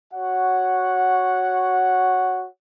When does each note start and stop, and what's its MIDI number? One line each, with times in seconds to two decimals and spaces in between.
0.13 2.48 66
0.13 2.48 73
0.13 2.48 78